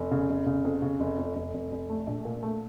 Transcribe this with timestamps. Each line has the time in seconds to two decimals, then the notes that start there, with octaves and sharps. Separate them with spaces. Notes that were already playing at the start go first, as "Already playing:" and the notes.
Already playing: F1
0.11 C#3
0.30 F1
0.46 C#3
0.65 F2
0.82 C#3
1.00 F1
1.18 F2
1.36 F1
1.54 F1
1.72 F1
1.90 A3
2.07 A#1
2.25 A#2
2.43 A3